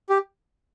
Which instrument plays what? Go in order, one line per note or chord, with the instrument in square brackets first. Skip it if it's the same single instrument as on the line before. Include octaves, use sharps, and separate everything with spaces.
[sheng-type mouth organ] G4